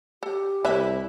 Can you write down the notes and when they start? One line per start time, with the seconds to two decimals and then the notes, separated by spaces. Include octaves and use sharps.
0.23 G4 A4
0.65 C2 E4 B4 C#5 E5